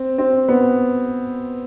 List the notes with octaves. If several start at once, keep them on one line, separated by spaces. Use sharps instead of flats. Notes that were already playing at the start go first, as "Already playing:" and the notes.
Already playing: C4
C4
B3